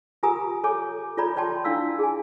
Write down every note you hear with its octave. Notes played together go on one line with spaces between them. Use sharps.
F4 G4 A#4 G#5 A#5 D#6
A4 C#5 G#5 D6
F4 A4 C#5 D5 A#5 B5
C#5 D5 G5 A5 C6
D4 E4 D5 F5 E6
G#4 G#5